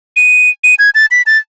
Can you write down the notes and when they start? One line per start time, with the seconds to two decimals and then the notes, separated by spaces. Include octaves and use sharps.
0.16 D#7
0.64 D#7
0.79 G#6
0.95 A6
1.11 B6
1.26 A6